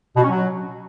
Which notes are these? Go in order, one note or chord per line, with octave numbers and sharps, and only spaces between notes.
B2
C#4
F#3